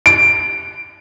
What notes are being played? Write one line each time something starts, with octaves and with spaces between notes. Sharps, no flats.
D7